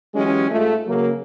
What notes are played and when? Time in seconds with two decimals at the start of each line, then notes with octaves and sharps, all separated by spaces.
0.15 E3 F#3 G#3 C#4 G4 G#4
0.51 G#2 A3 F4
0.87 C#3 F#3 A#3